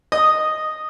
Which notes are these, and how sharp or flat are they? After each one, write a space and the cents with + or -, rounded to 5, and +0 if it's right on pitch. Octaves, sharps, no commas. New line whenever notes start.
D#5 -5 D#6 +0